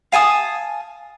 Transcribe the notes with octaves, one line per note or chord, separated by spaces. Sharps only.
F5 G#5 A5 D#6